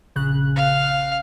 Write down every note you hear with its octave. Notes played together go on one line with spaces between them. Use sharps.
A#1 C#3 F#6
F5